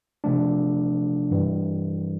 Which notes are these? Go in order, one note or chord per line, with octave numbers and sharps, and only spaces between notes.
C3 F3 A3 D4
G2 E3 G3